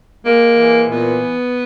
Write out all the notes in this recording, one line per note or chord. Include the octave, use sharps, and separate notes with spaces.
G#3 A#3
E3
A#2 B3